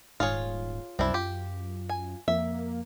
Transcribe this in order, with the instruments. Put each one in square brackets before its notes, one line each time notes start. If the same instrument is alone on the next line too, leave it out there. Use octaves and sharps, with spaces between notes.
[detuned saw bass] D#1 [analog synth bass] G#2 [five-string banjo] F4 G#4 C#5
[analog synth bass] C2 [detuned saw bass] F#2 [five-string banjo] C4 D4 E4
[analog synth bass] F4 [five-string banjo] G4
[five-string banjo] G#5
[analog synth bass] F2 [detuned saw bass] A#3 [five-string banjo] E5